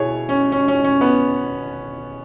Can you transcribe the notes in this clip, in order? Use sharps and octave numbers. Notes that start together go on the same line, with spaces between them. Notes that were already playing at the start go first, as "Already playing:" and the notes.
Already playing: B2 E4 G#4 C#5
C#4
C#4
C#4
C#4
B3